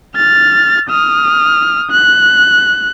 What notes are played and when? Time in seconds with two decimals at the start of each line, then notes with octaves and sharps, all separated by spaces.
0.16 F6 A6
0.89 D#6 F6
1.91 F#6